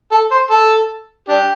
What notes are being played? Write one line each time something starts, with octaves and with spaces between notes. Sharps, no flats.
A4
C5
A4
D4 G4